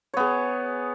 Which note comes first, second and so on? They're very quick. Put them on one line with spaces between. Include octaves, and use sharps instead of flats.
C#5 B3 G#4